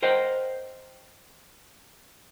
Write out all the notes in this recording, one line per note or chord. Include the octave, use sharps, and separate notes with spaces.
A#4 C5 D#5 F#5 G5